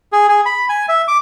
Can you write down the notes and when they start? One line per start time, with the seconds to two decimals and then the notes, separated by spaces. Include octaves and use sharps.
0.12 G#4
0.28 G#4
0.46 B5
0.69 G#5
0.88 E5
1.08 D6